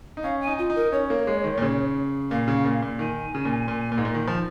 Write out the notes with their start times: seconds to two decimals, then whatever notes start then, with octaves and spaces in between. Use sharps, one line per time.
0.17 D#4
0.23 C#4 F5
0.41 G#5
0.47 D#4
0.58 F4
0.70 D#4
0.76 A#4
0.92 C#4 C#5
1.10 A#3
1.27 G#3
1.44 D#3
1.57 A#2
1.62 C#3
2.31 A#2 F5
2.48 C#3
2.65 A#2
2.82 A#2
2.99 D#3 G#5
3.35 C#3
3.45 A#2
3.68 A#2
3.92 A#2
3.98 G#2
4.05 A#2
4.14 D#3
4.28 F3